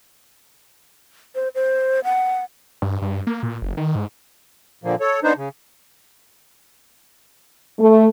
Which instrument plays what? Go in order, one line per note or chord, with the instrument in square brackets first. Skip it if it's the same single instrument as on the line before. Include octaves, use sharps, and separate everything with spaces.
[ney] C5
C5
F#5
[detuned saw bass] G2
G2
A#3
A#2
F#1
D#3
G#2
[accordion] A#2 D3 F3 A#3
A4 C#5
B3 D4 D#4 C5
C#3
[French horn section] A3